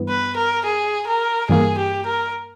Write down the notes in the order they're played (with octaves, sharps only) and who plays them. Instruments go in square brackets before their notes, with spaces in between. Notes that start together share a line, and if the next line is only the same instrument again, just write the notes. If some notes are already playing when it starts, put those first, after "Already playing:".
Already playing: [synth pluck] G2 E3 B3
[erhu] B4
A#4
G#4
A#4
[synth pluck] G2 E3 A#3 [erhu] G#4
[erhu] G4
A#4